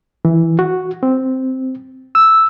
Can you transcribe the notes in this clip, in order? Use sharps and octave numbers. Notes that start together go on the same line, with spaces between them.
E3
F#4
C4
E6